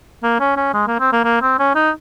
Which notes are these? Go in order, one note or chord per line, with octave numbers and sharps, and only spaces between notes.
A#3
C#4
C#4
G#3
A#3
C4
A#3
A#3
C4
C#4
D#4